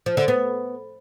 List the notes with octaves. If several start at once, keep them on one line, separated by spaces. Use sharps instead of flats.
F3
D3
B3